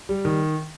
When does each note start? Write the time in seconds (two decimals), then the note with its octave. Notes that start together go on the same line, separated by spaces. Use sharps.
0.09 G3
0.25 D#3